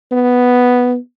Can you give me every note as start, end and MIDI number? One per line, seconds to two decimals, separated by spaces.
0.12 0.97 59